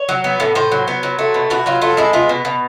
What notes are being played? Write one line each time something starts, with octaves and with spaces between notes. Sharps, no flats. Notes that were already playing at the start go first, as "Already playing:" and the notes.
Already playing: C#5
F#3
B3
A2
A2 C5
F#3
B3
F#3
A3
B2
B2 F#4
F#3 F4
A3 F4
G#3 E4
B3 F4
B2
B2